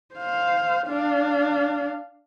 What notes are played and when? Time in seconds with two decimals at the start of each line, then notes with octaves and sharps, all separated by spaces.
0.15 C5 F5
0.87 D4 F5